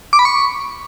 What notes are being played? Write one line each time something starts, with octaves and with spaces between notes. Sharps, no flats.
D6
B5
C#6